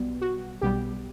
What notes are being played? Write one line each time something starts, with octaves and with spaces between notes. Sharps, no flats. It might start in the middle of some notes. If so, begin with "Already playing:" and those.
Already playing: B1 B2 G3 B3
F#4
B1 B2 G3 B3 G4